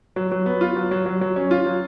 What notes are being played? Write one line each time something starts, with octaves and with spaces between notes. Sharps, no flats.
F#3
F#3
B3
F4
F#3
F#3
F#3
F#3
C#4
F4
F#3